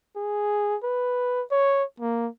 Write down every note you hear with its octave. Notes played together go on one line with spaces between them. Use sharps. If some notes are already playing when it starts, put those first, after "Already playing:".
G#4
B4
C#5
A#3